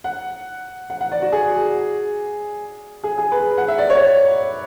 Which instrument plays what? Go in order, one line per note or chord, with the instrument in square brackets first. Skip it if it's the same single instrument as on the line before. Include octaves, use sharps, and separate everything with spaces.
[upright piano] F#5
F#5
F#5
D5
F#4
G#4
G#4
G#4
B4
F#5
E5
D5
C#5